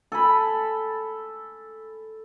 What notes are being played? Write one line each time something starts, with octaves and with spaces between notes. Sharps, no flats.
A4 G#5 B5